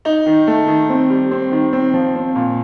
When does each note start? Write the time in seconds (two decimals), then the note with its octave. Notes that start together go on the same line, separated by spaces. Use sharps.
0.05 D#4
0.26 D#3
0.47 A3
0.67 D#3
0.89 C4
1.10 G3
1.31 C4
1.52 D#3
1.73 C4
1.94 F3
2.15 C4
2.36 A#2